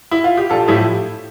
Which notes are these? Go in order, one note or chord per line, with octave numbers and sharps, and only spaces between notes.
E4
F4
G4
A#1 F4 A4
A2 F3 E4 G4